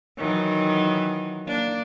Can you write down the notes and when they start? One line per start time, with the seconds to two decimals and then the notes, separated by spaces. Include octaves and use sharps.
0.18 D#3 E3 F#3
1.47 A#3 D4